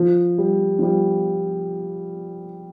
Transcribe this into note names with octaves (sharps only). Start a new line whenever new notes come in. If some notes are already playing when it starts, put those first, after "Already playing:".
Already playing: F3
G3
F3
G3